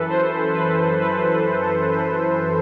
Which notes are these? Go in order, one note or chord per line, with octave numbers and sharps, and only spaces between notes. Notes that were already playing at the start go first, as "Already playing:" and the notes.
Already playing: F#2 E3 A4 B4
C5
B4
B4
B4
A4
B4